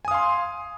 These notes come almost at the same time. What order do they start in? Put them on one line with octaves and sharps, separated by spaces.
G#5 D#6 F5 C6